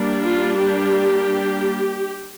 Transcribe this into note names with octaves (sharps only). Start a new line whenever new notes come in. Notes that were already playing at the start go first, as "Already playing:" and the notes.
Already playing: G3 A#3 D4
F4
G4